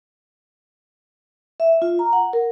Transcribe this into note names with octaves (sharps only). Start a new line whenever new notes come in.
E5
F4
A#5
F#5
A#4